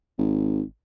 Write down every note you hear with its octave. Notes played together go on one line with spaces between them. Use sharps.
G#1